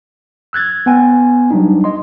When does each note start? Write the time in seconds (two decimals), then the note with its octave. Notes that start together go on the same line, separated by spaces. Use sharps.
0.53 E6 F#6 G#6 A6
0.86 B3 G5 G#5
1.51 F#3 G3 D4 D#4
1.84 D#5 C6